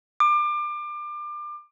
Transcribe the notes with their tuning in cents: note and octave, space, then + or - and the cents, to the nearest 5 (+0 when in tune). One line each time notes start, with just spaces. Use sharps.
D6 +30